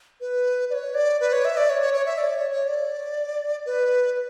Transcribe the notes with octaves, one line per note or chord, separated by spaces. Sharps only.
B4
D5
C#5
D5
B4
C#5
E5
D5
C#5
C#5
C#5
E5
D5
C#5
C#5
D5
B4